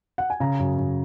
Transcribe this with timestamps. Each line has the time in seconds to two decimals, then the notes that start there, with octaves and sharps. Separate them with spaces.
0.18 F#5
0.30 G#5
0.40 C#3 A#5
0.59 F#2
0.78 F#2